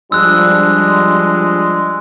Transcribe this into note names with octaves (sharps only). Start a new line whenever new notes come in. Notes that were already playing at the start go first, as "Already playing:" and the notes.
F3 G3 G#3 D4 E6 F#6